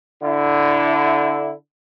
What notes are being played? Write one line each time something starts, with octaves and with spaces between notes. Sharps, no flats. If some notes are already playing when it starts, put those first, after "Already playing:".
D3 E4